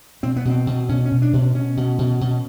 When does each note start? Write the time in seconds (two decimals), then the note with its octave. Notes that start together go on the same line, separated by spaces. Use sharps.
0.23 B2 C4
0.36 B3
0.45 B2 C4
0.67 B2
0.89 B2 C#4
1.05 C#4
1.11 B2
1.22 D4
1.33 B2
1.38 C#4
1.54 B2 C#4
1.77 B2
1.98 B2
2.21 B2